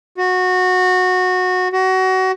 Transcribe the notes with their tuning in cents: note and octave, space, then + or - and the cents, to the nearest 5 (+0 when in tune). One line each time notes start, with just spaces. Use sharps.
F#4 -15
F#4 +25